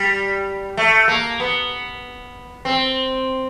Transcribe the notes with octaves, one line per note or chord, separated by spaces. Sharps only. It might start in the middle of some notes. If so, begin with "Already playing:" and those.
Already playing: G3
A3
A#3
B3
C4